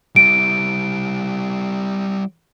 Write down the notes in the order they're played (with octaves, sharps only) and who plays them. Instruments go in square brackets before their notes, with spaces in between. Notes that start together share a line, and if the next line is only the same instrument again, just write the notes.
[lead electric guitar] G3 E4 [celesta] D7